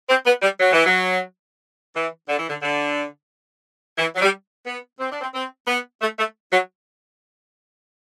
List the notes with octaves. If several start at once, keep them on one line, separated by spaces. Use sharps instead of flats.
C4
B3
G3
F#3
E3
F#3
E3
D3
E3
D3
D3
E3
F#3
G3
B3
C4
D4
C4
C4
B3
A3
A3
F#3